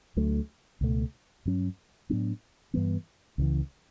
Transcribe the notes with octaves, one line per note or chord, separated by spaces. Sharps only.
D2 D3 F#3 A3
C#2 B2 A3
G2 F#3 C#4
A2 F#3 B3 D4
G2 E3 G3 B3
C#2 C#3 E3